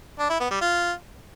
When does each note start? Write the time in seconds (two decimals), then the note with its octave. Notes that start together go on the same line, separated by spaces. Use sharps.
0.19 D4
0.30 E4
0.40 B3
0.51 G3
0.61 F4